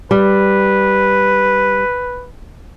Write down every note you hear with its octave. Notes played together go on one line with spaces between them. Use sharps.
G3 B4